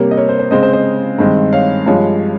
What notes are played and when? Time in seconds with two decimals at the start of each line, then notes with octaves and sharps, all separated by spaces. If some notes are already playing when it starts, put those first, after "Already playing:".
Already playing: C3 G3 A#3 A#4 C#5
0.11 D#5
0.17 A#4 C#5
0.29 C5
0.39 C5
0.51 C#3 G#3 C4 C5 D#5
0.63 C5
0.73 C5 D#5
1.19 G2 D#3 G#3 C4
1.53 C#5 F5
1.86 G2 F3 G#3 C#5 F5